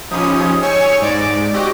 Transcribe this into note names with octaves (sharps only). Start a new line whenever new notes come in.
F3 C#4 D#4 G4 B5 D#6
G#4 D#5
C#5 G5 G#5 C#6 E6
G#2 D5
C4 F#4 G4 D#5 D6